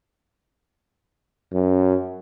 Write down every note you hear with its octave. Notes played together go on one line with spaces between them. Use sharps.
F#2